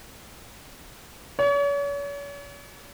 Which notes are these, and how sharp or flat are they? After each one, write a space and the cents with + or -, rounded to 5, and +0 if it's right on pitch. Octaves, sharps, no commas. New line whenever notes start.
C#5 +40